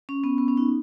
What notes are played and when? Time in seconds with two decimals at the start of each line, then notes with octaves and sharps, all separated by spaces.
0.09 C#4
0.24 B3
0.38 B3
0.48 C#4
0.57 D#4